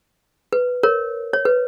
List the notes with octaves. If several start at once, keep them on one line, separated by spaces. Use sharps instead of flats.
B4
A#4 C#5
C#5
B4